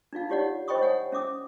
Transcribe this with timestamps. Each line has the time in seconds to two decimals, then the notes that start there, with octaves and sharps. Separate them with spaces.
0.13 D4 D#4 F4 F5
0.29 D#4 F4 G4 C#5 D5 F#5
0.68 C5 D#5 G5 B5 C#6 D#6
0.81 C#5 F#5 G#5
1.12 C#4 E5 D6 D#6